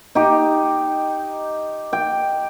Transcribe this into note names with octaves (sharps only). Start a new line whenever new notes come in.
D#4 G4
G5